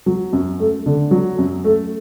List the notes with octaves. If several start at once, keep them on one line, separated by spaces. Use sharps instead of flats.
F#3
F#2
A3
D3
F#3
F#2
A3